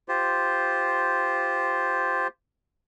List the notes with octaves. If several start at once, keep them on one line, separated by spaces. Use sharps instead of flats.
F4 G4 C5